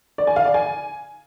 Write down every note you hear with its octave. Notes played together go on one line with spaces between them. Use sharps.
D5
G#5
F5
D5
G#5